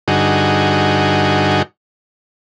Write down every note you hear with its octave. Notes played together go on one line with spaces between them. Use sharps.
G2 D3 D#4 F#4 G#4